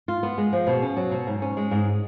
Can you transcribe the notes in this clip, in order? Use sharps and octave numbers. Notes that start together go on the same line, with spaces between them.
F4
B3
G#3
F3
B2
C#4
F#3
B2
G#2
C#4
G#3
G#2